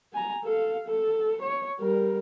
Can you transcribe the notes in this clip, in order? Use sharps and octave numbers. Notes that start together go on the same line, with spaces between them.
G#5 A#5
A4 F5
A4
C#5
G3 A#4